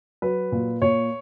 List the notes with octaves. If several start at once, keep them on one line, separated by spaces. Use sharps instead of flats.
F#3 B4
A#2
A#2 C#5